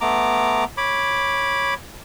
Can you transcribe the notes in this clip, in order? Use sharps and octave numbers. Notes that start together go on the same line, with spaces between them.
A3 B3 A#5 D6
C#5 B5 D6